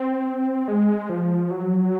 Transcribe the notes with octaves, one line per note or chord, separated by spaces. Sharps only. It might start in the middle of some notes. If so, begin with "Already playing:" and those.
Already playing: C4
G#3
F3
F#3